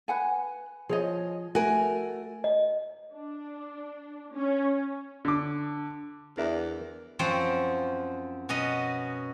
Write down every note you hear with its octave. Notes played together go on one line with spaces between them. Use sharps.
B4 F#5 G#5
F3 G#4 C#5 D#5
A3 F#4 A#4 G#5
D#5
D4
C#4
D3 D6
E2 D4 A#4 E5
F#2 F3 C4 C#5
B2 F#3 C#4 D#5